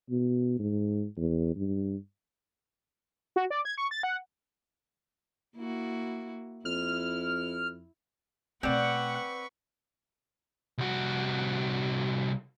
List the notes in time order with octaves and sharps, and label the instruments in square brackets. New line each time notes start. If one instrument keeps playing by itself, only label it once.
[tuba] B2
G#2
E2
G2
[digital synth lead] F#4
D5
G#6
C#6
A6
F#5
[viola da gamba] A#3 E4 F#4
[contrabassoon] F2 [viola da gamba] E4 [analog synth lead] F6
[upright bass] B2 A3 [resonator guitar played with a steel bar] C4 D5 [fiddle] B4 C#6 [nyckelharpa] F#5
[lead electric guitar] C2 F#4